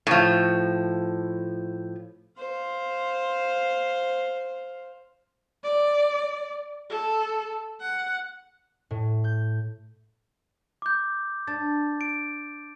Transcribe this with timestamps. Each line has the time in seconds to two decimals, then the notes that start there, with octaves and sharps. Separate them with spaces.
0.07 A2 F3
2.37 C5 F5
5.63 D5
6.89 A4
7.80 F#5
8.91 A2
9.24 G6
10.82 D6 G6
11.47 D4 A6
12.01 D7